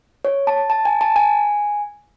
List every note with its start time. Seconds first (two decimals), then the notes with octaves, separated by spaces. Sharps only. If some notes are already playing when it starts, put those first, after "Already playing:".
0.25 C#5
0.47 A5
0.70 A5
0.85 G#5
1.01 A5
1.16 G#5